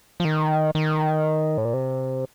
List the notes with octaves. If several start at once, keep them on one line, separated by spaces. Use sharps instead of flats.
F3
D#3
D#3
A2
A#2
C3